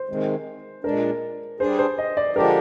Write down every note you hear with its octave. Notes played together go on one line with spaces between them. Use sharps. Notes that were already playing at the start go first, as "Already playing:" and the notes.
Already playing: C5
C3 D#3 G#3
A#2 G#3 D4 A#4
G3 D4 G#4 C5
C5
D#5
D5
D3 F3 G#3 D4 G4 A#4